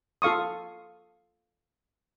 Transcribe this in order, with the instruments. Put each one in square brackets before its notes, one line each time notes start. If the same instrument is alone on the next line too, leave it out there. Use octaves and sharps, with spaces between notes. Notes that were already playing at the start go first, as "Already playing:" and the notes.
[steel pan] F4 A4 F5 C#6 D#6